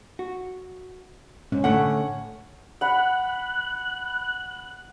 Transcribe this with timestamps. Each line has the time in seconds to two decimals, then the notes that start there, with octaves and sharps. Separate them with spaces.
0.19 F#4
1.52 G#2 C#4
1.64 A2 D3 A3 F#5
2.81 F#5 B5 F#6